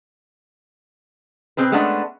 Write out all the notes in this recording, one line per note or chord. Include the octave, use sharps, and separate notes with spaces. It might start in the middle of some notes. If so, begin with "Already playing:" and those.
B2 C4 G#4 B4
G#3 A3 B3 C#4 D4